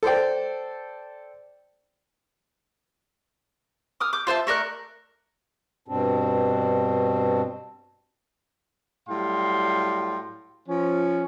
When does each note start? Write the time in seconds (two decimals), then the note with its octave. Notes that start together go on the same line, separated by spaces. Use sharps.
0.03 A4 C5 D5 G5
4.00 D6 D#6 F6
4.13 D6 G6
4.27 F4 C5 E5 A5
4.47 A3 A#4 D5 F#6
5.88 G2 B2 C4 D4
9.09 A2 F#3 G3 F5 G5 C6
10.69 F3 C#4